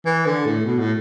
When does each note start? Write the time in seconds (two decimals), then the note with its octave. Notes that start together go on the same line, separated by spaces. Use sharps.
0.05 E3
0.26 D3
0.46 A2
0.65 B2
0.79 A2